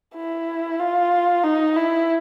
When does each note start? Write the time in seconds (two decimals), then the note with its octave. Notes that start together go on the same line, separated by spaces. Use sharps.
0.15 E4
0.79 F4
1.44 D#4
1.76 E4